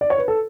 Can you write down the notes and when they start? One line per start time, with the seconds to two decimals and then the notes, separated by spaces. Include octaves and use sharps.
0.01 D5
0.10 C#5
0.18 B4
0.28 A4